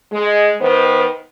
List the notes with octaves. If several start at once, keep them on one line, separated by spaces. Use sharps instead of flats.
G#3
D#3 B3 C5